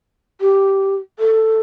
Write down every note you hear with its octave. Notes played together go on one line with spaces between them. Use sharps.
G4
A4